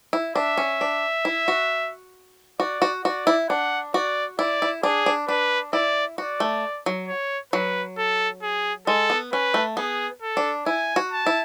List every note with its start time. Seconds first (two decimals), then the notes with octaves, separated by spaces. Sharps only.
0.13 E4
0.36 D4 E5
0.58 C#4
0.81 D4
1.25 E4
1.48 F#4
2.60 F#4 D5
2.82 F#4
3.05 F#4 D5
3.27 E4
3.49 D4 F#5
3.94 F#4 D5
4.39 E4 D5
4.62 E4
4.83 D4 G#4
5.06 D4
5.28 D4 B4
5.73 E4 D5
6.18 F#4 D5
6.40 A3
6.86 F#3
7.08 C#5
7.53 F#3 B4
7.98 A4
8.42 G#4
8.87 G#3 A4
9.10 B3
9.32 C#4 B4
9.54 A3
9.77 B3 G#4
10.22 A4
10.37 D4
10.66 E4 G#5
10.96 F#4
11.12 A5
11.26 E4